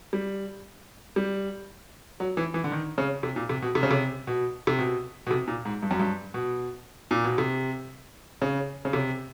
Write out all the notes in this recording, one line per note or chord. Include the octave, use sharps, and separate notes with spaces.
G3
G3
F#3
E3
E3
D3
D#3
C#3
C3
A#2
C3
B2
C3
C#3
C3
B2
C3
B2
B2
C3
A#2
G#2
G2
F#2
G2
B2
A#2
B2
C3
C#3
C#3
C3